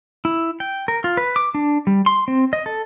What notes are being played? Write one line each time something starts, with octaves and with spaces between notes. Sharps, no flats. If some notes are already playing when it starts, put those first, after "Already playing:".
E4
G5
A#4
F4
B4
D6
D4
G3
C6
C4
D#5
A4